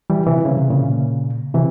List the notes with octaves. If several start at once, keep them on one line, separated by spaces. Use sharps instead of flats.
E3 G3
C3 E3
C#3
C3
A#2 C#3
C3 E3